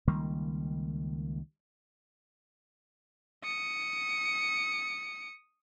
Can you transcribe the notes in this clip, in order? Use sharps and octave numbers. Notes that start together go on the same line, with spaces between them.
C#2 D#3 G3 A#3
D#6 C#7